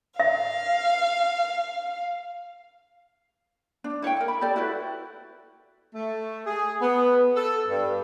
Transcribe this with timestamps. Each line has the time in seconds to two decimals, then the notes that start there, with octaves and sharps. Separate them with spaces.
0.20 E5 F5
3.84 D4
4.02 E4 C#5 E5 G5
4.16 A#4 G5
4.28 B5
4.41 G4 A4 D5 A5
4.56 E4 F#4 B4
5.95 A3
6.46 G#4
6.82 B3
7.36 A4
7.68 G2